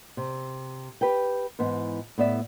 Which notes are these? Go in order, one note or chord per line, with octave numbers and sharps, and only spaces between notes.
C3
G4 B4 G5
G#2 E3 B3
A2 B3 D5 E5